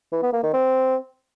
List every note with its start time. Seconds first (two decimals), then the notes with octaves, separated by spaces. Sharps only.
0.12 E3
0.23 B3
0.33 A#3
0.43 D#3
0.53 C4